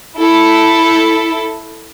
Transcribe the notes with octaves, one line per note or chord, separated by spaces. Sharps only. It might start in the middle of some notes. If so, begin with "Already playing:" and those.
E4 A4